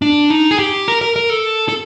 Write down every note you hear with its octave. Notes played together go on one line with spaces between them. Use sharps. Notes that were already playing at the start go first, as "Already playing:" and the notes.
D4
D#4
G#4
G4
A#4
A#4
A#4
A4
A4